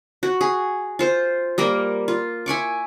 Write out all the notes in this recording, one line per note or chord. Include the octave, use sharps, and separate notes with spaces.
F#4
G#4
F4 C5
G3 A#3 A#4
F4
E4 G#5 C#6 D6